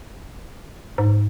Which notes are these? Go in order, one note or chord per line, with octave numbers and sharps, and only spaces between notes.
G#2